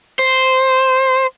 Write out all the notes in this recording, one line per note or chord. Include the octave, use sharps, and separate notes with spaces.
C5